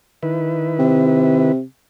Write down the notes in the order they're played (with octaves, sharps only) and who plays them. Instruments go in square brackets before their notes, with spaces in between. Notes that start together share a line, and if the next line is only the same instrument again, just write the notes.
[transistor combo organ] D#3 E4 B4
[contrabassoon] C3